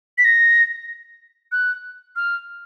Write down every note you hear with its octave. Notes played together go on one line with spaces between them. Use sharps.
B6
A#6
F#6
F6